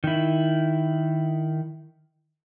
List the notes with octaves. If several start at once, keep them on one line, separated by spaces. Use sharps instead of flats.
D#3 E4